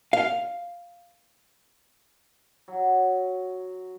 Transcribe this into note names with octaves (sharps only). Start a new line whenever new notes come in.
F5
F#3